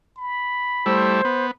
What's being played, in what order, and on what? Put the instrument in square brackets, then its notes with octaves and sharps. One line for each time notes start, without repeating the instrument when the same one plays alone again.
[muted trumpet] B5
[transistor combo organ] G3 A3 E4 [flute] C5
[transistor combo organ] B3